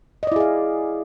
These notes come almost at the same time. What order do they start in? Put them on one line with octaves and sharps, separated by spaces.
D#5 D5 E4 G#4 F5